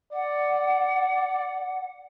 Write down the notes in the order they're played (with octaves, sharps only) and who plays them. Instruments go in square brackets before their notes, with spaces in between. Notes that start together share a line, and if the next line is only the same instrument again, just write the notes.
[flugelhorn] D5 [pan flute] F#5